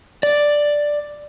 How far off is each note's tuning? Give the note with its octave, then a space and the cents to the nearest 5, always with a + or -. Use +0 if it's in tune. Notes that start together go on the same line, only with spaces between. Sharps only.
D5 +0